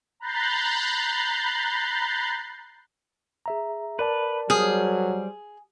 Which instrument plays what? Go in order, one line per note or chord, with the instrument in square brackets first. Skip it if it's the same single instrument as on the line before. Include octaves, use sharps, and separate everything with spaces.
[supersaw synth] A#5 B5 F#6 G6 A6 C7
[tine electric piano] G#4 E5 A#5
[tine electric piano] A#4 D5 A5 [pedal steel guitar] B4
[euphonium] F#3 [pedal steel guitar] G3 C5 F6 [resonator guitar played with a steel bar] G#4